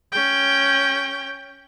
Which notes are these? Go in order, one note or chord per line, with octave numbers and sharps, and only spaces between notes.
C#4 G5